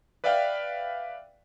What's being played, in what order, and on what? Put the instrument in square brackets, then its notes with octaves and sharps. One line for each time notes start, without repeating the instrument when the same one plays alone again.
[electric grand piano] B4 D5 E5 F5 G5